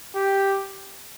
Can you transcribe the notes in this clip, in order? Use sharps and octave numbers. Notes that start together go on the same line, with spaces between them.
G4